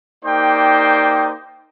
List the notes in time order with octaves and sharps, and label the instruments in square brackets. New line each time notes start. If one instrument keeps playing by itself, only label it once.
[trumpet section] A#3 D#4 G4 C5 D5 G5